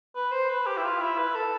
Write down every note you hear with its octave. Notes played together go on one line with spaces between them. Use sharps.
B4
C5
B4
G4
E4
F4
E4
B4
A4